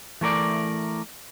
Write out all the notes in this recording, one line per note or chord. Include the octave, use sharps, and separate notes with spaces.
E3 A3 A#4 D5